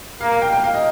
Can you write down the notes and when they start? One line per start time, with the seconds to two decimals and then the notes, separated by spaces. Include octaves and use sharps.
0.21 A#3 F5
0.32 F5
0.42 G5
0.53 G5
0.64 F5
0.74 D#5